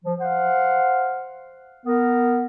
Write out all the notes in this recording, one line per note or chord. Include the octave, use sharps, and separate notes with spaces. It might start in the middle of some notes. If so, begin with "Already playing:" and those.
F3
C5 F5 F#5
B3 A#4